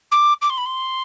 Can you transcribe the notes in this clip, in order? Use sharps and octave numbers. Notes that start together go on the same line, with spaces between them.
D6
D6
C6
B5
C6